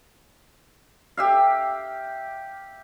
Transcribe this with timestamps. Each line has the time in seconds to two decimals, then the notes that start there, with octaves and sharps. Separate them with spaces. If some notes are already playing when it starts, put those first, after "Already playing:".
1.17 G4 E5 F5